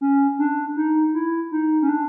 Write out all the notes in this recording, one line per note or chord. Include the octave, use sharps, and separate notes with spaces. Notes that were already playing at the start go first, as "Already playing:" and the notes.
C#4
D4
D#4
E4
D#4
C#4
D4